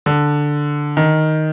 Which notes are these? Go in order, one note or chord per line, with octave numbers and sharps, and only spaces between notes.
D3
D#3